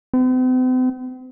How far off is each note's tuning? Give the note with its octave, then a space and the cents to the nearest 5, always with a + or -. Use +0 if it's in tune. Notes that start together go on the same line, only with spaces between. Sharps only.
C4 -45